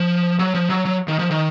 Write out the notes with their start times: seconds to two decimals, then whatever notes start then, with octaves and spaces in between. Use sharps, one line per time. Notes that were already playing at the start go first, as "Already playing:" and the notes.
Already playing: F3
0.39 F#3
0.54 F3
0.70 F#3
0.85 F#3
1.08 D#3
1.19 F3
1.31 D#3